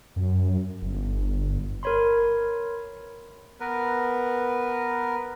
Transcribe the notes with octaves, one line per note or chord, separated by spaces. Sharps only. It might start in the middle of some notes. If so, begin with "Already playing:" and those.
F#2
G1
A#4 B4 C#5 B5 C6
B3 A#4 B4